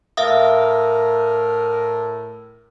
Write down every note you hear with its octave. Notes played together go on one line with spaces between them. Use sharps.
A2 A#4 E5 F5 D#6